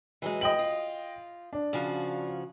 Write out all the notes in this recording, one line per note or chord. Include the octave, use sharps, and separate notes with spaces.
E3 F#3 G#3
D#5 G5 F#7
F4
D4
C#3 F3 F#4